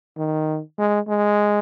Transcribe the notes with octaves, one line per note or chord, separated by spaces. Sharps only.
D#3
G#3
G#3